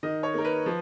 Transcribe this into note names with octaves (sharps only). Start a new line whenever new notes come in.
D#3 D#5
C#5
A#3 D#4 A#4
B4
F3